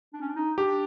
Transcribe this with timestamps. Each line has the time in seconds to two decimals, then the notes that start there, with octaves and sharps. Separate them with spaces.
0.13 D4
0.21 C#4
0.28 D4
0.36 D#4
0.58 D4 G4